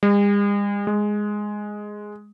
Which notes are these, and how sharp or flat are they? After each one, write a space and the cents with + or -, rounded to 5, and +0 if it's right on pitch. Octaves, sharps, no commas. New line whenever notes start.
G#3 -45
G#3 +0